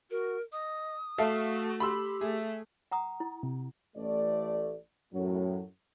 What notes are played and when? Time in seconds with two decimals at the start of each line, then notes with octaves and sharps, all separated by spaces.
0.11 F#4 A#4
0.52 D#5 D#6
1.18 A3 F#4 A4 E5 F5
1.80 G4 B5 C6 E6
2.21 A3 G#4 E5
2.92 F#5 A#5 D#6
3.20 E4
3.43 C3
3.96 A1 A3 D5
5.13 F#2 A2 F#3